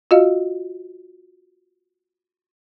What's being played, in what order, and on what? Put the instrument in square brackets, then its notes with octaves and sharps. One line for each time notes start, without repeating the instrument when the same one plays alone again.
[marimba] F4 F#4 D#5 F5